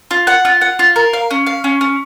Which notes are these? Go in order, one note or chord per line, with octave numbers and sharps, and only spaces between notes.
F4
F#5
F4
F#5
F4
A#4
F5
C#4
F5
C#4
C#4